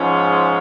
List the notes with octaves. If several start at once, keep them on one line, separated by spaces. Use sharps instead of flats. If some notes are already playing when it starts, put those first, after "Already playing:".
Already playing: G#2 F3 G#3 C#4